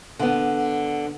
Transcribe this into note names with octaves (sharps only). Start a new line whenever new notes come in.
D3 B3